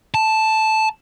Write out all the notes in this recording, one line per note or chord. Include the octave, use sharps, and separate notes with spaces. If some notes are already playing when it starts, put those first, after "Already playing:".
A5